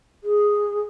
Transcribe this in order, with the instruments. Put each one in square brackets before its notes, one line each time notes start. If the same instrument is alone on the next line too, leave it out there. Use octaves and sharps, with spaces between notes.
[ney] G#4